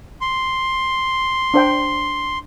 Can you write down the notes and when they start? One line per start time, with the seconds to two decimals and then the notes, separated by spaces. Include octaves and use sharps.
0.21 C6
1.54 D4 C5 G5